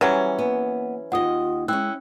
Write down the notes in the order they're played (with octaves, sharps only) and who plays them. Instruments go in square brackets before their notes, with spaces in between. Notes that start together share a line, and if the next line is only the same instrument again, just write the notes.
[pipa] E3 F#3 C#4 [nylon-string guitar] G3
[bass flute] A#3 [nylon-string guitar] B3
[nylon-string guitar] D#2 D#5 [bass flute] F4 [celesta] F#5 D#6
[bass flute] G#3 [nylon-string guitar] C#4 E4 [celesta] G5 E6 F#6